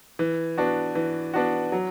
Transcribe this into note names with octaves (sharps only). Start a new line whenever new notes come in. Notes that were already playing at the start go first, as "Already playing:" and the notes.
E3
B3 D4 F#4
E3
B3 D4 F#4
F#3